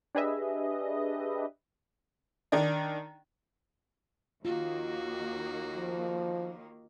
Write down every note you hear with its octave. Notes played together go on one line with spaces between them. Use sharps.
D4 G4 G#4 B4 D#5 E5
D#3 D4
D#2 D#3 A#3 F4 F#4
F3